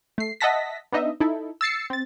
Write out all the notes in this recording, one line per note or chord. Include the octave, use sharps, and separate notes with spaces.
A3 C7
D#5 E5 F#5 A5 A#6 B6
B3 D4 D#4 D#5 E5
D#4 E4 A4
E6 A6 C7 C#7
C4 A6